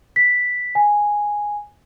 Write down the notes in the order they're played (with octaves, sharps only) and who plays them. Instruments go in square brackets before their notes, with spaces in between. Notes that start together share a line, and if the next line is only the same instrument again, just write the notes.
[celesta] B6
G#5